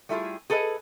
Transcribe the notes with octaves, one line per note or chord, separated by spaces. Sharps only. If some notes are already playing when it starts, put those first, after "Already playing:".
G3 A3 E4 F4 G4 G#4
G#4 A4 B4 D5 D#5